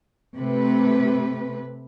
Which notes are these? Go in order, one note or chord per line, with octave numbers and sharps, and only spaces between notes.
C3 A3 B4